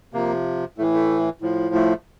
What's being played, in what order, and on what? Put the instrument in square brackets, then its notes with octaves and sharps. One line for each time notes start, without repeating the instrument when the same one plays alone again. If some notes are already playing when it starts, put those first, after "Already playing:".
[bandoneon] C3 F3 A#3
A2 A3
E3
A3
A2 F3
A3